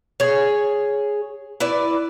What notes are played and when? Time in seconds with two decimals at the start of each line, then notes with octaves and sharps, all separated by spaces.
0.20 G#4 C#5
1.60 E4 B4 D5